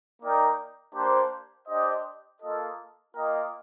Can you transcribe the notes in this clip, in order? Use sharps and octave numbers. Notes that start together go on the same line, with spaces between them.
A#3 D#4 A#4 D5 G5
A#3 D4 G4 C5
D4 G4 C5 D#5
A#3 F4 A4 D#5
A#3 F4 A#4 D#5 G5